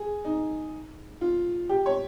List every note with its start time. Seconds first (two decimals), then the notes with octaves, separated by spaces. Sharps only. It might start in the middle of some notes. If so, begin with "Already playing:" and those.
Already playing: G#4
0.25 D#4
1.21 F4
1.69 G4
1.86 C#5